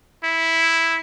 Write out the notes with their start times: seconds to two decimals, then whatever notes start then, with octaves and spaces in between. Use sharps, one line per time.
0.24 E4